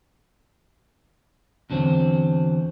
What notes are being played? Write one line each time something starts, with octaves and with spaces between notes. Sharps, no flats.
E2 D3 F#3 C4